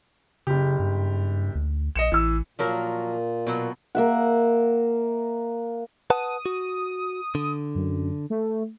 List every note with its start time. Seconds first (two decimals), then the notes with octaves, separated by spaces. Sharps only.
0.47 F#1 C#3 G4
0.79 G2
1.55 D2
1.96 A#1 D#5 C#7 E7
2.12 A1 E3 E6
2.59 A#2 F3 F#3 A#4
3.47 B2 F#3
3.95 A#3 E5 F#5
6.10 B4 F#5 A5 D#6
6.46 F#4
7.35 D3
7.75 F#2
8.30 A3